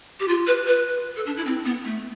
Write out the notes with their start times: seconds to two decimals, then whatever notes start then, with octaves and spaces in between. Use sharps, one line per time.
0.20 G4
0.28 F4
0.47 B4
0.67 B4
1.16 A4
1.26 D4
1.37 E4
1.46 C4
1.65 B3
1.85 A3